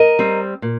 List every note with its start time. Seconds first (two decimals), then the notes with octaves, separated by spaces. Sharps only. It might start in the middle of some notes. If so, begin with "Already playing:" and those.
Already playing: A#4 D#5
0.19 G3 C4
0.62 A#2